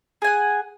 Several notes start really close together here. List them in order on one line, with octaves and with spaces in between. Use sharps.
G#4 G#5 F#5